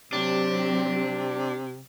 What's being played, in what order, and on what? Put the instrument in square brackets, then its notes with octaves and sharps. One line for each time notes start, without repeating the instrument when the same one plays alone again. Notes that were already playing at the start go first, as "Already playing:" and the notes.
[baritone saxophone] C3 [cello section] F#3 C4 G4 [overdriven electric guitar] D4